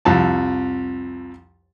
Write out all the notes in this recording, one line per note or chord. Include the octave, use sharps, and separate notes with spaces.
C2 F2 A5